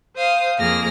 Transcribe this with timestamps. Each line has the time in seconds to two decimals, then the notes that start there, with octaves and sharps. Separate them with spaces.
0.16 C5 F5 D#6
0.59 F2 A#3 G#4 F6 A#6